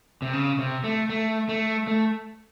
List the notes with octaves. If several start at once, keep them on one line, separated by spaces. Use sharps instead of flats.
C3
C#3
C3
A3
A3
A3
A3